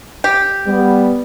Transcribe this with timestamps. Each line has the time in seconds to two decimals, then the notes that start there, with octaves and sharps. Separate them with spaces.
0.24 G4
0.67 G3 B3